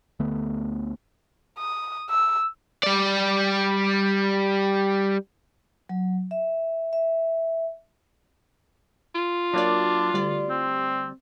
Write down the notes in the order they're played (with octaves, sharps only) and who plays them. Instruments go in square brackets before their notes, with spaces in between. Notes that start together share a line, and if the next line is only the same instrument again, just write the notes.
[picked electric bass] D2 D3 A3 B3
[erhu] D#6
E6
[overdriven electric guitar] G3 D5
[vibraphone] F#3
E5
E5
[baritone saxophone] F4
[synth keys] F#3 A#3 D5 [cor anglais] D4
[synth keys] D2 G3 D5
[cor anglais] C4